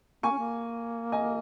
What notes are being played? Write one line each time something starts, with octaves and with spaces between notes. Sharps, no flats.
A#3 G#5 C#6
C#4
A#3
D#5 G#5